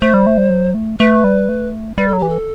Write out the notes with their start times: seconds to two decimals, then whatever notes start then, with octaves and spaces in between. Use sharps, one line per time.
0.01 A3 C5
0.14 G3
0.27 A3
0.38 G3
0.50 F#3
0.74 A3
0.99 A3 B4
1.24 G3
1.49 A3
1.98 G3 B4
2.08 A4
2.13 F#3
2.19 E3 G4
2.29 A4